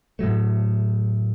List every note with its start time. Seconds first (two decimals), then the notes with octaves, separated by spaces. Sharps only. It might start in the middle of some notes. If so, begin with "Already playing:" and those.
0.19 A2 F#3 A3